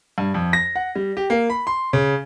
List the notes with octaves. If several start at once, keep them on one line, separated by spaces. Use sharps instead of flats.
G2
F2
A#6
F#5
G3
G4
A#3
B5
C6
C#3